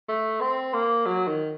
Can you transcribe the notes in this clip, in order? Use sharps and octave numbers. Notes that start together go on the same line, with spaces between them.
A3
C4
A#3
F#3
D#3